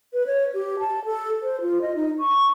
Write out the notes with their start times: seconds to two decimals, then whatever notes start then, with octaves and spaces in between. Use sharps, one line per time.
0.13 B4
0.27 C#5
0.54 G4
0.79 A5
1.05 A4
1.42 C5
1.61 F4
1.82 D#5
1.96 D#4
2.19 C#6